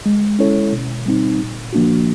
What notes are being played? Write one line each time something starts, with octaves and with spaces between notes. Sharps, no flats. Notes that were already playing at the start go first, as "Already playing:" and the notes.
G#3
C#4 E4 A4 C#5
B2
G3 C4 D#4
A#2
F3 A#3 D4 F#4